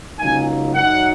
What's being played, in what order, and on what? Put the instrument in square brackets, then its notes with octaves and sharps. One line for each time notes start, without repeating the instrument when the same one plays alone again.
[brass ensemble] C#2 C#3 F#3 A#3 D#4 G#5
F#2 F#3 D#4 F#5